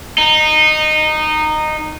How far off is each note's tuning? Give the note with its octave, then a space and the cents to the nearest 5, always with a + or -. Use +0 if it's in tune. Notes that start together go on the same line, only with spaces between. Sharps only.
D#4 -15